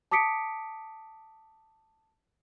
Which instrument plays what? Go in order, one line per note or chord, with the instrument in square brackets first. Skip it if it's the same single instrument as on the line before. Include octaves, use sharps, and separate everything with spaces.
[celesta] A5 D6 D#6 B6 C#7 D7